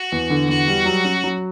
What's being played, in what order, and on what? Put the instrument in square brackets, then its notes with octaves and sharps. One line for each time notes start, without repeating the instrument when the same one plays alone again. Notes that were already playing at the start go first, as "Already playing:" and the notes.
Already playing: [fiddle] F#4
[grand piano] E2
D3
[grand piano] E2 [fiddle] F#4
[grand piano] G3
F#3
C#4
F#3